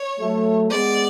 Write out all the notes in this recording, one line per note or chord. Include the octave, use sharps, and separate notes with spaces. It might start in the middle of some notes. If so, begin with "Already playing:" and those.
Already playing: C#5
F#3 A3
G#3 B3 D5